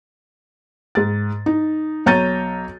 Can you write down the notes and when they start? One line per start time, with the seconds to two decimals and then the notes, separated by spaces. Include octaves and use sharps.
0.95 G#2 A6
1.46 D#4
2.06 B1 C#5 A#5 G6 A6 D#7